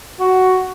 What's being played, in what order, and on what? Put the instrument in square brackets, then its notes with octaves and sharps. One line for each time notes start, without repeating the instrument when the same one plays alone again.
[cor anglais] F#4